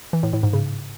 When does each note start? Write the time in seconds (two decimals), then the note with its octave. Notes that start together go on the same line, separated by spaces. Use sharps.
0.13 E3
0.23 A2
0.33 A2
0.43 G#2
0.53 C#3